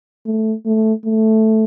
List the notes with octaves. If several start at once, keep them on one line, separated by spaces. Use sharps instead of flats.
A3
A3
A3